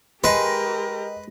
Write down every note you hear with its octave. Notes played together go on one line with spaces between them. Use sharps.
G#3 G4 A#4 B4 D#5 A#6